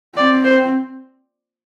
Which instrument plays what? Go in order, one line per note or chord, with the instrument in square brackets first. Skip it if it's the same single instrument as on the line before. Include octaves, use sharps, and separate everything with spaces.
[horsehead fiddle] C4 [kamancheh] D5
[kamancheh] C5